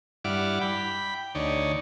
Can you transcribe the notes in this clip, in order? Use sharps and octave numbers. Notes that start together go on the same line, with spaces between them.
G2 E4 D5 F#5 D6 F6
G5 B5
D2 D#4 C#5 D5